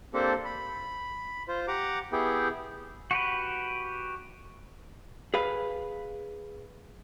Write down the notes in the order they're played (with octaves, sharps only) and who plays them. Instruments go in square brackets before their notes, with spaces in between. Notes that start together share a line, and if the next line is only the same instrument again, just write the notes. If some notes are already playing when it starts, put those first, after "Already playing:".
[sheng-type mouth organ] A#3 C4 D4 G4 A4 C5
B5
F4 C5
G4 F#5 A#5 D6
B3 E4 G4 G#4 G5
[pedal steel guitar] F#4 G4 B4
[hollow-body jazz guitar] G#4 B4 F5